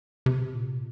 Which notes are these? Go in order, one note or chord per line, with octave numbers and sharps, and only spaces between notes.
C3
A#2